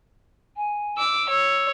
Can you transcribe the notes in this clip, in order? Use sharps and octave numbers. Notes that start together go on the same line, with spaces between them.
G#5
D6 E6
C#5 E6